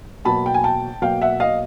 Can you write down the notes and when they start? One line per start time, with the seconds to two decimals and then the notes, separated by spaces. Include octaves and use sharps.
0.25 B2 F#3 A#3 A5 B5
0.46 G5
0.54 G#5
0.64 G5 A5
1.02 B2 F#3 A#3 F5 G5
1.22 E5 F#5
1.40 D#5 F5